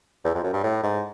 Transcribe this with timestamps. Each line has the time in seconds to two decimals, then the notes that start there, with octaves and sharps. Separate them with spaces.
0.24 E2
0.35 F2
0.44 F#2
0.53 G2
0.63 A2
0.83 G#2